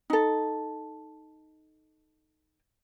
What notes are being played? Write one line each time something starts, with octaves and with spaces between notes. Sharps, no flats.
D#4 A4